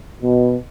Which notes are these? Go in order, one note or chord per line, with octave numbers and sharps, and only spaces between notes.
B2